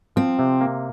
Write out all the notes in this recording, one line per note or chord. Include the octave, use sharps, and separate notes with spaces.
F3 C4
C3
A#3